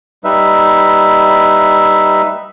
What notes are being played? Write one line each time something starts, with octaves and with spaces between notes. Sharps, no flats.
G3 D#4 B4 E5